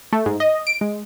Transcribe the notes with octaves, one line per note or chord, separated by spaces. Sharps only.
A3
G#2
D#5
D7
G#3